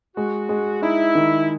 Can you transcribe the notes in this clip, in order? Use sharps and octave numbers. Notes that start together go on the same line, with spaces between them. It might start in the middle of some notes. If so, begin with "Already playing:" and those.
G#3 F#4
G#3
D#4 E4
D#3